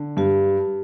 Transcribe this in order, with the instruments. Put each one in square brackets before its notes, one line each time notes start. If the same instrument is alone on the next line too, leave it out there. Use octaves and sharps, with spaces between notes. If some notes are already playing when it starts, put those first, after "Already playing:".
Already playing: [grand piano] D3
[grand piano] G2 [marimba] G4